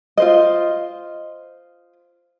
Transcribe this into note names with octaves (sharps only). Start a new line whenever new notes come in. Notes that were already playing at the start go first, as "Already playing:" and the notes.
F4 C5 D#5